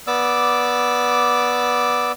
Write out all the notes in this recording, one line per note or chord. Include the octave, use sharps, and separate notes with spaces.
B3 D5 D6 E6